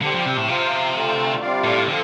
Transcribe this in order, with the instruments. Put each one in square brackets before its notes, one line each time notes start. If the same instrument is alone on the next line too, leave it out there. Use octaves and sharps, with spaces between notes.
[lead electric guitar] D3 [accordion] G3 C4 G4
[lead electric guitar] F3
C3
A2
[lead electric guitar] C3 [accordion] F3 C4 F4 C5 F5
[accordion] D3 A3 F4
C3 G3 F4 D5 F5
[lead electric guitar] A2
[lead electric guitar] D3 [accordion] F3 C4 A4 F5